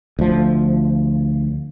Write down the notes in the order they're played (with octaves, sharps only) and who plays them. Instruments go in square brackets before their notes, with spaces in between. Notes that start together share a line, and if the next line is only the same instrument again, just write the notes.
[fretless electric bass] D2 F3